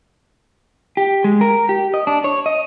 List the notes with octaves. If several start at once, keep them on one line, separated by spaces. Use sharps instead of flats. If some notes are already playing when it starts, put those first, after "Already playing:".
G4
G#3
A#4
G4
D#5
D4
C#5
D#5